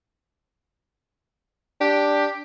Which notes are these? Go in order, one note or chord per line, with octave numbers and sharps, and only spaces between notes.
D4 G4